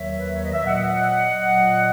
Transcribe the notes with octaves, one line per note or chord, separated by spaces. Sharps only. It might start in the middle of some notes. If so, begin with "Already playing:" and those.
Already playing: D#2 D#3 F#3 C#5 E5
B4
C#5
D#5
E5
A#2 F#3 D#5 F#5
A#2 F#3